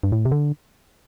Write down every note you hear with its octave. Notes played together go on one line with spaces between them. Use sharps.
G2
A2
C3
D3